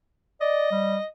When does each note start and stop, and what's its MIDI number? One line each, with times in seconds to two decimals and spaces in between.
0.41 0.71 74
0.41 1.06 75
0.72 0.97 55